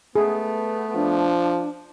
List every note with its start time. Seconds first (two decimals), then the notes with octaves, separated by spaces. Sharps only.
0.15 A3 B3 G#4
0.95 F3 D4